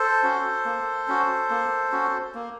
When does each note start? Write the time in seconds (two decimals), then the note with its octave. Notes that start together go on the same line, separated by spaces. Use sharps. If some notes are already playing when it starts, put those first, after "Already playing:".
Already playing: A4 C5
0.23 C#4 F#4
0.65 A#3
1.08 C#4 F#4
1.50 A#3
1.92 C#4 F#4
2.35 A#3